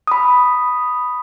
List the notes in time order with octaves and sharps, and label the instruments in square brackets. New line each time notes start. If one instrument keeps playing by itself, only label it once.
[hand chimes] B5 D#6